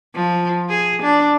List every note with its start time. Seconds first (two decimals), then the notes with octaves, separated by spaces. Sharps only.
0.15 F3
0.69 G#4
1.02 D4